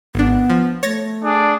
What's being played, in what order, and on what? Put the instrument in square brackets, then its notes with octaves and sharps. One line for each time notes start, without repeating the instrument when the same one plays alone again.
[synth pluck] G#1 D4 [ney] B3
[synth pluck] F3
[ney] A3 [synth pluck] C#5 A6 A#6
[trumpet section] D4 G#4